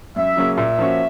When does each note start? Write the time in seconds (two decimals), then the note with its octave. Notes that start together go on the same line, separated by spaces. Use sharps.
0.16 F#2 E5
0.37 C#3 F#3 A#3 C#4
0.57 A#2 E5
0.79 F3 A#3 C#4 F#4